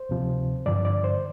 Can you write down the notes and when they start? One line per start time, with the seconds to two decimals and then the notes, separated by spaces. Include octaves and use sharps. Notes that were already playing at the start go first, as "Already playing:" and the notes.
Already playing: C5
0.09 D2 C3 F3
0.66 G2 D3 F3 D5
0.85 D5
1.04 C5